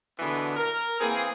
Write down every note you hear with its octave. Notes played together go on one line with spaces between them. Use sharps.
B2 D3 E3 G#3 B3
A#4
E3 A#3 C4 G#4